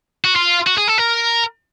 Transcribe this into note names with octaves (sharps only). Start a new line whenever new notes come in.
F#4
F4
F#4
G#4
A4
A#4